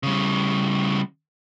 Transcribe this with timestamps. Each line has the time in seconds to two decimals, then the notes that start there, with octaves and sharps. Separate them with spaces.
0.03 C#3 G3